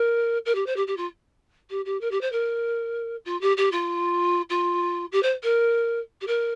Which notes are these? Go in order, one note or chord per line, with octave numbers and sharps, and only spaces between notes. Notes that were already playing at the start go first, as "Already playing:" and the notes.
Already playing: A#4
A#4
G4
C5
G4
G4
F4
G4
G4
A#4
G4
C5
A#4
F4
G4
G4
F4
F4
G4
C5
A#4
G4
A#4